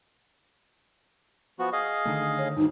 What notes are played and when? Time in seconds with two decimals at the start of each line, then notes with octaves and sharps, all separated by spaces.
1.59 F3 B3 F#4
1.73 G#4 D#5 F5
2.05 D3 D#3 A3
2.38 C#5
2.56 D2 G2 D#3 D#4